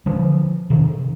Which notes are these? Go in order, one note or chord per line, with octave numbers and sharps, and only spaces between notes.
D3 F3
C3 D#3